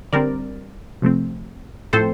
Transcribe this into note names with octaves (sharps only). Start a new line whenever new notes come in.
D3 G3 C4 A#4 D5
C3 F3 A3 C4
A2 F3 A3 C4 A4 C5